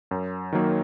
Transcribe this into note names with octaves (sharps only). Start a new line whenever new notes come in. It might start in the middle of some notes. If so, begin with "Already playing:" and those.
F#2
D#3 F#3 A#3